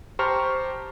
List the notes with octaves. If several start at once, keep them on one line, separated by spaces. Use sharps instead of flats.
G4 C5 A5 A#5 C#6 F6